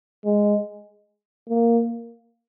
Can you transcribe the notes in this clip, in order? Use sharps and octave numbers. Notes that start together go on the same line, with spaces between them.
G#3
A#3